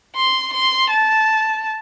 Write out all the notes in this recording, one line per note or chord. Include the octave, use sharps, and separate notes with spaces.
C6
C6
A5